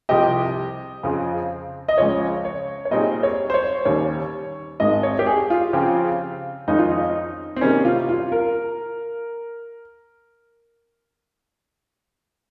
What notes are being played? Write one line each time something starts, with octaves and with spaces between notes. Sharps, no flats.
C2 C3 F3 C4 G4 D#5
F2 C#3 F3
D#5
C#2 C#3 F3 C#5
C#5
C#5
A#2 G3 C4 D#4 G#4 D#5
C#5
C5
C#5
D#2 D#3 G3 C#4 C#5
G#1 G#2 D#3 G#3 D#5
C#5
G4
G#4
F4
C#3 F3 C4 G4
F2 D#3 G#3 C#4 D#4
F4
D#4
C4
C3 D#3 G3 A#3 C#4 D#4
F4
F4
A#4